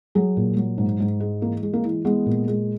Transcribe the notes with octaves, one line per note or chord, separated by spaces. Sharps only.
F#3 G#4
A#2
F#3
G#2
G#2
G#3
E3 A#3
G#3
A#3
E3
G#3 B3
A#2
G#3